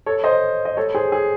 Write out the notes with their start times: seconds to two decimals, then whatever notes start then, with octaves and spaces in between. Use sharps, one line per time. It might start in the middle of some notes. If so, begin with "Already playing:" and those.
0.06 A4 C#5
0.24 C5 D#5
0.65 D#5
0.77 A4 C#5
0.95 G#4 C5
1.12 G#4